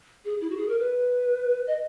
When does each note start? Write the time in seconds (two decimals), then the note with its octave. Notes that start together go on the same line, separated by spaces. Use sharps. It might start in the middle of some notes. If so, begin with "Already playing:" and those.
0.25 G#4
0.41 E4
0.50 F#4
0.57 G#4
0.69 A#4
0.79 B4
1.67 D#5